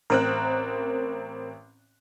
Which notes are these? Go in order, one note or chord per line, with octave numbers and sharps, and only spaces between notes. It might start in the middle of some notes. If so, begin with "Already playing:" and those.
A1 C4 A#4 F#6